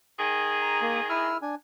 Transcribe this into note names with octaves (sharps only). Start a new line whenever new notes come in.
D#3 G#4
A#5
A#3
E4 E6 F6
D4 G#5